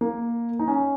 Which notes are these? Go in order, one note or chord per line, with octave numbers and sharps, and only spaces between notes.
A#3
D#4
C#4